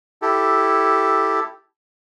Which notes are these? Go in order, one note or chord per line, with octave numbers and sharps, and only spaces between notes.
E4 G4 A4